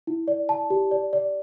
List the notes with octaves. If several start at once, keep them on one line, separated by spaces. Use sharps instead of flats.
E4
D5
A5
G4
D5
D5